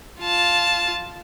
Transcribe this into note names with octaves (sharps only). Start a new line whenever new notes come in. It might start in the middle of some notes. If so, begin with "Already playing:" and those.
F4 A5